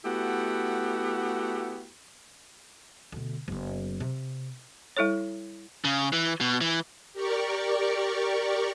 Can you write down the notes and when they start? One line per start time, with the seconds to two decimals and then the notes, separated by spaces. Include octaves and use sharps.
0.04 A3 B3 E4 F#4 G4
3.12 D2 B2
3.48 F#1 B3
4.00 C3
4.97 G3 E4 A4 C#5
5.85 C#3
6.13 E3
6.41 B2
6.61 E3
7.13 G4 A#4 D5 C#6